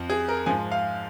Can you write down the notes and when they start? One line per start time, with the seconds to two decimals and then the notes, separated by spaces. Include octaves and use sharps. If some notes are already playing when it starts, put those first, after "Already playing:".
Already playing: F2 F3
0.10 G#4
0.28 A#4
0.46 G#2 F3 G#5
0.72 F5